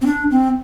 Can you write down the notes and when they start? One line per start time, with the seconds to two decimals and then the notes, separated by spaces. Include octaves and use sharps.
0.01 C4
0.06 D4
0.31 C4